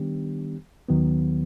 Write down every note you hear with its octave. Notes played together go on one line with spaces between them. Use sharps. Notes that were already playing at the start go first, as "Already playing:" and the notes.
Already playing: D#3 G3 B3 D4 G4
D#2 D#3 F#3 B3